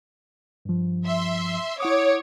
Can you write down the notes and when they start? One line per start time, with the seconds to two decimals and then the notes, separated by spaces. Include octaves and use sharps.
0.65 G2 F3
1.05 E5 C6
1.80 E4 C#5 F#5 D6 D#6